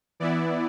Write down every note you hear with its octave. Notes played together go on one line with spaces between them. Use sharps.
E3 B3 E4 D5